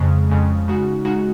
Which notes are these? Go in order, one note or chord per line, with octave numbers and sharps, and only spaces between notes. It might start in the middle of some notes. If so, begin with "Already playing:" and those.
Already playing: F2 C#3 G#3
F2 C#3 G#3
C#3 G#3 D#4 F#4
C#3 G#3 D#4 F#4